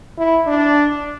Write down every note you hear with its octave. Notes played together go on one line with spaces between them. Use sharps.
E4
D4